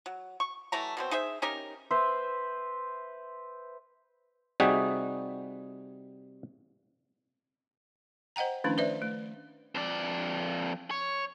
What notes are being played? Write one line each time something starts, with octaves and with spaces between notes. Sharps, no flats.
F#3
C#6
E3 F#3 A3 A#5
B2 F#3 C4
D#4 G#4 C5 E5
C#4 D#4 G4 A#4
B4 C5 E5
C3 G3 D#4 F#4 G#4
C5 D#5 F#5 G5 A#5
D#3 F3 A3 C#4 D4 E4
B4 C5 D5 E5
A3
F2 D5
C#5